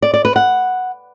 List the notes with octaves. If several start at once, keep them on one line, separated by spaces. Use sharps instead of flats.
D5
D5
B4
F#5